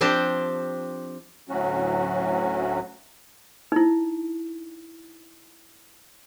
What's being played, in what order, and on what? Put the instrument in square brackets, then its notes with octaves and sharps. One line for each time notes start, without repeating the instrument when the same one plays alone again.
[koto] F3 C4 D4 G4 C5
[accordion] D2 A2 F#3 C#4 F#4
[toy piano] D#4 E4